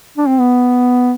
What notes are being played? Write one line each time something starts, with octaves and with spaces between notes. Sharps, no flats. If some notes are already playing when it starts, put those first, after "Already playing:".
D4
C4
B3